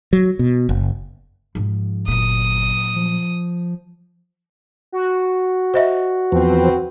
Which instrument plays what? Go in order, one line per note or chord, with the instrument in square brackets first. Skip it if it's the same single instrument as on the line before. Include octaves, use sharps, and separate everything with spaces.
[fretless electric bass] F#3
B2
F#1
[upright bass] G#2 F3
[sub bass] G1 [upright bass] A#2 F#3 [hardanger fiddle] D#6
[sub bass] F3
[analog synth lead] F#4
[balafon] C5 D#5 E5
[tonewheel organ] E2 F3 [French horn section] C4 B4